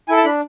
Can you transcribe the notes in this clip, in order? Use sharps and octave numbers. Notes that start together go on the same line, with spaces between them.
E4 A4 G#5
A5
D4 B5